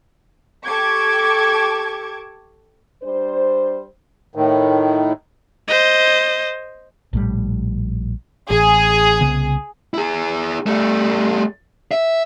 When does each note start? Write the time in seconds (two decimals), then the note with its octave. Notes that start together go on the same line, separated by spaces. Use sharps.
0.64 G4 A4 A5 C#6 D6 G#6
3.03 G3 D4 C5
4.35 A2 D#3
5.68 C5 D#5
7.13 A#1 A2 G3
8.51 A1 G#4
9.21 C2 C#3 B3
9.94 E4 G#4
10.66 G3 A3
11.91 E5